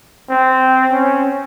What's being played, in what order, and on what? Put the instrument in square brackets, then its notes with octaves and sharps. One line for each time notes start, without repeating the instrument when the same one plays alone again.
[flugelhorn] C4
C#4